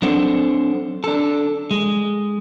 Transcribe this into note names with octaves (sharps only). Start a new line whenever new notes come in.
F#3 C4 D4 A4 C5 F#5
D4 A4
G#3